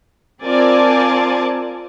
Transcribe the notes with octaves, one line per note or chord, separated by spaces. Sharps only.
C4 F4 A#4 D5 G#5 A5